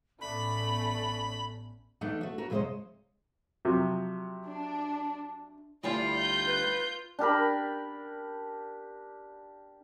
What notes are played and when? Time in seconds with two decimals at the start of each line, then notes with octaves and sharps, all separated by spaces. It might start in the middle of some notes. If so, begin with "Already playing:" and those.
0.21 A1 A3 B3 C#4 D5 B5
2.01 E3 A3 D4 D#4 F#5
2.21 A3 F#4
2.38 F#4 A#4 B4
2.50 F2 C3 G#3 C5 C#5 D#5
3.65 C3 F3 F#3
4.49 D4
5.83 D2 G3 E4 F4 D5 G5
6.15 G6
6.47 B4
7.19 D4 G4 A#4 B5